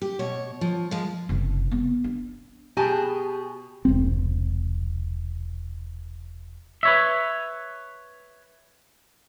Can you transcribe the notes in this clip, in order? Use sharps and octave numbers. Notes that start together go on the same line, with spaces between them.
G4
B2 C#5
F3
F3 G#3
F#1 C3
B3 C4
D4
B2 G4 G#4 G#5 A5
E1 C2 C4
B4 C#5 E5